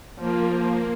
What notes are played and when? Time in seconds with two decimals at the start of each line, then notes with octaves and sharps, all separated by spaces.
0.19 F3 A#3